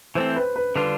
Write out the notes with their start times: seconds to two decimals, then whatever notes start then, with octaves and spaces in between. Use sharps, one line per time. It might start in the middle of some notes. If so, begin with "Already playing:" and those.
0.15 E3 A3 C4 C5
0.36 B4
0.56 B4
0.75 D3 G3 D4 F4 B4